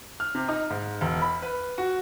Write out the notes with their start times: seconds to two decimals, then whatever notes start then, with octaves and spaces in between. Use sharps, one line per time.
0.20 F6
0.35 C3
0.48 D#4
0.70 G#2
1.01 E1
1.22 B5
1.42 B4
1.78 F#4